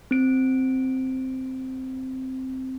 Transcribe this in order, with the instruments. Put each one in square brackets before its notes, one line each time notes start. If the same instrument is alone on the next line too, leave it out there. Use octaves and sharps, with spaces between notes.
[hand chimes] C4 D7